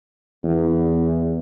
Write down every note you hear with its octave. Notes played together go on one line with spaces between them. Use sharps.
E2